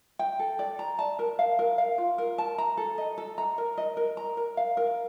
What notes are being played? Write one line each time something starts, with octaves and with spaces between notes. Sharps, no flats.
G5
A4
D5
A#5
A5
A#4
F5
A#4
F5
F4
A#4
A5
A#5
A4
D#5
A4
A#5
A#4
D#5
A#4
A#5
A#4
F5
A#4